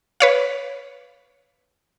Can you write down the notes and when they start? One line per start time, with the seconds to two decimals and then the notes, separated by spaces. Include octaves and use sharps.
0.20 B4 C#5 F5